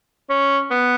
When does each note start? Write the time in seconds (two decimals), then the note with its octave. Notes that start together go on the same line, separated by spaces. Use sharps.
0.30 C#4
0.71 B3